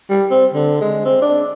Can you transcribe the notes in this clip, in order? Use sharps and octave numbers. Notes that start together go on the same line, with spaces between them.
G3
C4
D3
G#3
C4
D4